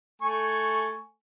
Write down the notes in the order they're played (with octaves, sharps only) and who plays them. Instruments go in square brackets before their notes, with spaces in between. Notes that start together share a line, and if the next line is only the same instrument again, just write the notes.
[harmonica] A3 G#5 C#6